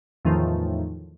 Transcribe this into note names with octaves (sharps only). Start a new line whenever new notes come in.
E2 A2 D#3 F3